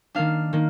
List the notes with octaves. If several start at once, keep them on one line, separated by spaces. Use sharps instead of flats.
D#3 A#3 D4 F5
D#3 A#3